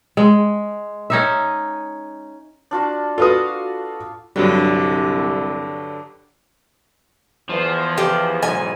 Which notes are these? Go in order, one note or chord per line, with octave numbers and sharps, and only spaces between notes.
G#3
C#4 D#4 E5
D4 F4 F#4
F4 F#4 A4 B4 F5 D#6
C2 G2 D3 F#3 G3
E2 F3
G4
B1 E2 G#2 G#5